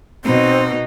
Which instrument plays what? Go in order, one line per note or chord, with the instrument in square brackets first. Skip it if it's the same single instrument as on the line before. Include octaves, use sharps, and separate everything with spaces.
[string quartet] B2 D#4 [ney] C4